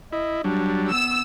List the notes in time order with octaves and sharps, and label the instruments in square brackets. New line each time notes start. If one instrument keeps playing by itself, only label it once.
[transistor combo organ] E4 [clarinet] D#5
[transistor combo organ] F#3 G3 [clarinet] D4
[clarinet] B3 [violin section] E6